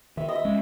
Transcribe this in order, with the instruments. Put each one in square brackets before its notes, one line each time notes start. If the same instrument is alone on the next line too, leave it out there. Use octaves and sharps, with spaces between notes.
[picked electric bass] D#3 [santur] E5
[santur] D#5
E5
[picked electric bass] G#3 C#4